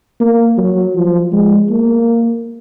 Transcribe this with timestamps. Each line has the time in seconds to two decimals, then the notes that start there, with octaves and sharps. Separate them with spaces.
0.20 A#3
0.57 F#3
0.96 F3
1.33 G#3
1.70 A#3